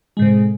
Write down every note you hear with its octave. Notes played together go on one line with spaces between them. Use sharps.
A2 C3 G#3